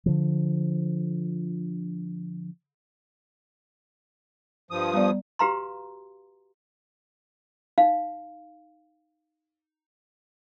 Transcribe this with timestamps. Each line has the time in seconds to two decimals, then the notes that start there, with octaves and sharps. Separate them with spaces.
0.06 D3 F3
4.71 G2 F3 D#6
4.94 G3 B3 D5
5.39 F#4 G4 B4 F5 A#5 C6
7.78 D#4 F5